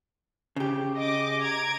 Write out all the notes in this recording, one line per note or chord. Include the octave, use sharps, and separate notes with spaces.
C#3 G4
D#5 D6
A#5 G#6 D7